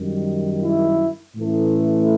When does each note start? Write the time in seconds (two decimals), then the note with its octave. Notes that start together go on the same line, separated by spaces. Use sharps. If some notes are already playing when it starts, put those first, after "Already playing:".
Already playing: F#2 D#3 G3
0.64 E4
1.36 A2 E3 A3 C#4